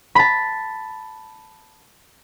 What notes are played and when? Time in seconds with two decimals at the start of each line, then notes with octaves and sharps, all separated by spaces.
0.15 A5 B5